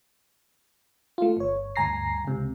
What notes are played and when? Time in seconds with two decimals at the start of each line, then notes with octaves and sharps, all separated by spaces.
1.18 A3 F4
1.37 G1 C#5
1.76 D2 G2 G#5 A#5 A#6 C7
2.24 C#2 C3